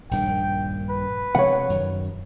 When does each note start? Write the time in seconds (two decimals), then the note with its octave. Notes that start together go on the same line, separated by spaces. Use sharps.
0.11 A#1 G2 D#3 G5
0.89 B4
1.35 C3 F3 G#3 C#5 F#5
1.70 F#2 D#3